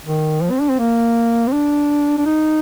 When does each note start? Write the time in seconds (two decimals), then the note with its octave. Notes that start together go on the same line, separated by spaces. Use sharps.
0.06 D#3
0.43 F3
0.51 C4
0.61 D4
0.70 C4
0.79 A#3
1.48 C4
1.53 D4
2.18 D4
2.26 D#4